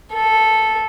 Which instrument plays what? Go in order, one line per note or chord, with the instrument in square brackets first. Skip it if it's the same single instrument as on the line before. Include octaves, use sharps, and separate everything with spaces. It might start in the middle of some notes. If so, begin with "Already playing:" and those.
[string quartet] A4